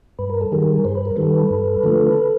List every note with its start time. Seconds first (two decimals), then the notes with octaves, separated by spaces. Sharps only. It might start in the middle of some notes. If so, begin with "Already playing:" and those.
0.19 G2 B4
0.30 A#4
0.41 A4
0.52 D#3 G3 G#4 A#4
0.85 G2 C5
0.95 B4
1.05 A#4
1.16 D#3 G3 A4 B4
1.50 G2
1.84 D3 F3 A3